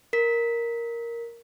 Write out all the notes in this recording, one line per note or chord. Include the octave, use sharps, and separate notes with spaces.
A#4 B6